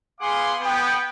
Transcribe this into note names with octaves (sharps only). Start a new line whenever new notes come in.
B3 G#4 F5 F#5 C6 D6
B3 G5